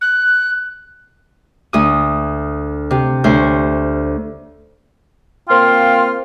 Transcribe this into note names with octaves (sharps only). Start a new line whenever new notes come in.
F#6
D2 D#6
C3
D2 C5 C#5
A#3 C4 F4 G5 C6 F6